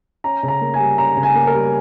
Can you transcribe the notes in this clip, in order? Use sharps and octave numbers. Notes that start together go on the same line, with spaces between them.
C#4 A#5
C#3
A#5
A#3
G#5
G3
C#4 A#5
C#3
G#5
A#3
A#4
G3